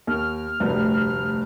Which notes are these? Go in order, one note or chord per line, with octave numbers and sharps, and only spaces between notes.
D#2 F6
F1 D2 G2